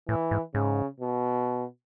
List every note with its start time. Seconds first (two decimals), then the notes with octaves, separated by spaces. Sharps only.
0.09 A2 E3
0.31 G#2
0.55 G#2 C#3
1.00 B2